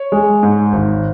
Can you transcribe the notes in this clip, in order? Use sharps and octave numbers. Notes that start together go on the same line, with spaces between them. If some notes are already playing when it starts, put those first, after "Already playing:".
Already playing: C#5
G#3
G#2
G#1